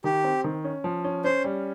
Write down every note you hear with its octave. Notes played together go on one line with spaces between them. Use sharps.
D#3 G4
C4
D#3
C#4
F3
C#4
C#4 C5
G3